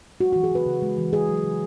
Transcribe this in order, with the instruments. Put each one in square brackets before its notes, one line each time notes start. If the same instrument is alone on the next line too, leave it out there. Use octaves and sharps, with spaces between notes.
[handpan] G#3 F#4
F#4
E3
G#4
C#3 B4
C#3
G#3
E3
C#3 G#4
F#3
C#3